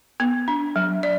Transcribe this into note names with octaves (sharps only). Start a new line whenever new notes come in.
B3
D4
F#3
D5